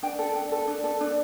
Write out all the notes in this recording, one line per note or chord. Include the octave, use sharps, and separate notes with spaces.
D4 G5
A4
D4
A4
D4
A4
D4